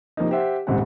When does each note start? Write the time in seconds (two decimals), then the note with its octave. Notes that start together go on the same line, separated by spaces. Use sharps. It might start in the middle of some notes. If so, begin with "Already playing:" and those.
0.17 C3 F3 A#3 D#4
0.31 G4 C5 E5 F#5
0.67 D#1 G#2 C#3 C4 F#5